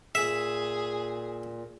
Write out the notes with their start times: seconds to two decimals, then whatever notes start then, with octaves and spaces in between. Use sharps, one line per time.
0.15 A#2 G#4 E5